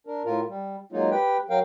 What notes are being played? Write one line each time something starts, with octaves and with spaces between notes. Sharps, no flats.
D4 A#4
A2 F4 A#4
G3
F#3 G#3 A#3 D#4 F4
G4 B4 G5
F#3 A#4 F5 G5